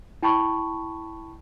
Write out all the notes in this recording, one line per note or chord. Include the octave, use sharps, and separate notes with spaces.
E4 G5 A5 B5 C#6